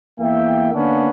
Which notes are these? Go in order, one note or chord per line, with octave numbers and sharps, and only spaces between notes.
E2 A#3 E5 G5
D3 A#3 B3 C#4 D4